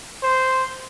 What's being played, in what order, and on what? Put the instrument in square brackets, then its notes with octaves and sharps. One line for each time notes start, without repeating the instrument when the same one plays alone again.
[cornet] C5